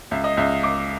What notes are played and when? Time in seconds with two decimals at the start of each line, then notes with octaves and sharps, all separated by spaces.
0.11 C#2 E5
0.24 D#5
0.37 C#2 E5
0.63 C#2 D6